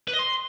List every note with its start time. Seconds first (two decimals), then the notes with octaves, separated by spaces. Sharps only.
0.08 B4
0.13 D#5
0.19 C6